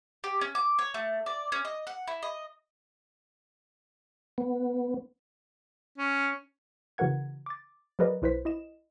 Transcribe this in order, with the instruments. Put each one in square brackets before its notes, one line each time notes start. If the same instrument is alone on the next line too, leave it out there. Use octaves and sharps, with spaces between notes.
[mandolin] G4
C#4
D6
C#5
A3
D5
C#4
D#5
F#5
E4
D#5
[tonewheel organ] B3
[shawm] C#4
[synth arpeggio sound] C#3 E3 F#4 A#4 F#5 G#6
D6 A6
F#3 G#4 A#4 B4 D5 D#5
B1 E4 B4 C5 B6
E4 D#5 E7